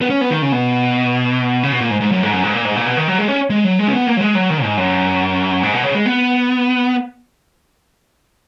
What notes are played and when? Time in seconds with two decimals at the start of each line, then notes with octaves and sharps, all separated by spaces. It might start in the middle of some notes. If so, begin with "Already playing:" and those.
0.01 B3
0.10 C#4
0.21 B3
0.31 D#3
0.42 C#3
0.52 B2
1.63 C#3
1.72 B2
1.80 A#2
1.91 G#2
2.01 G#2
2.12 F#2
2.23 G#2
2.33 F#2
2.44 G#2
2.54 A#2
2.65 G#2
2.76 A#2
2.86 B2
2.97 D#3
3.08 F#3
3.19 G#3
3.28 C#4
3.50 G#3
3.64 F#3
3.79 G#3
3.88 C#4
3.93 B3
4.07 A#3
4.17 F#3
4.21 G#3
4.35 F#3
4.50 D#3
4.63 G#2
4.77 F#2
5.63 G#2
5.73 B2
5.84 C#3
5.95 G#3
6.06 B3